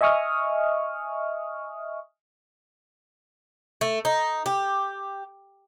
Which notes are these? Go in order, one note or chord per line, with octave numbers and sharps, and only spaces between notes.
D#5 E5 G#5 C#6 D#6 F6
A3
D#4
G4